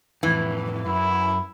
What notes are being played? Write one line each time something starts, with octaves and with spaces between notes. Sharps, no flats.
F2 A2 E3
F#2 E4